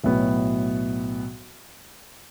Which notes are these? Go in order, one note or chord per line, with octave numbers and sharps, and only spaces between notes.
B1 A2 F#3 B3